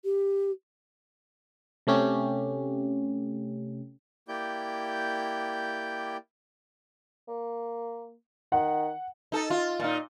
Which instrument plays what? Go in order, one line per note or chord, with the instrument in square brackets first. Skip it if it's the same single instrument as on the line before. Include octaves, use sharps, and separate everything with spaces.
[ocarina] G4
[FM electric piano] C3 A3 C#4 G4
[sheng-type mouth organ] A#3 E4 G4 D5 G5 G6
[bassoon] A#3
[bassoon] D#3 [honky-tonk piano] F#5
[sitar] D#4 A4
F4
A#2 D#4